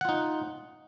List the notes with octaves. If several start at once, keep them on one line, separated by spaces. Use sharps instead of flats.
D#4 F4 F#5